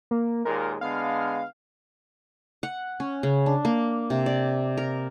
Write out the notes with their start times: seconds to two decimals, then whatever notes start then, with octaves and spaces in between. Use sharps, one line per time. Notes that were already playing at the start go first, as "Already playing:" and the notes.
0.11 A#3
0.45 D#2 A#2 G#3 A#4
0.81 D3 G#3 B3 F5
2.63 F#5
3.00 C#4
3.23 C#3
3.46 D4
3.65 A#3
4.10 C3
4.26 D5
4.77 A#4